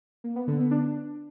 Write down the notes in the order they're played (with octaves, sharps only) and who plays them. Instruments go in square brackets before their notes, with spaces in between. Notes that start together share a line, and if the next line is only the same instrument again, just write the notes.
[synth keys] A#3
B3
D3
B3
D4